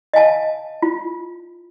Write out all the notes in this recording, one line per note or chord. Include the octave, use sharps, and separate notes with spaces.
D#5 F5 G#5 A5
F4